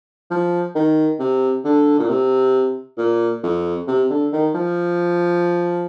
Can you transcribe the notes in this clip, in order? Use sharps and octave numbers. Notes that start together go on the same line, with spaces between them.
F3
D#3
C3
D3
A#2
C3
A#2
F2
C3
D3
D#3
F3